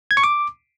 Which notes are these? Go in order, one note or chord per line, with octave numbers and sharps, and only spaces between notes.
G#6
C#6
D6